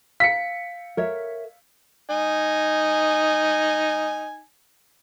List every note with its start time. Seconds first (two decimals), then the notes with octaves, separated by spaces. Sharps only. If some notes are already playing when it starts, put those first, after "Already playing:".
0.20 F5 B6 C#7
0.97 A#4 C#5 E5
2.10 D#4 G#5